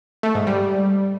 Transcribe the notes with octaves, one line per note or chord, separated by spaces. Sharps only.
A3
G#2
G3